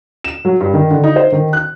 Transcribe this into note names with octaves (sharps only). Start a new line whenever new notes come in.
E7
F#3
G2
D#3
D3
D#4
C5
D#3
F#6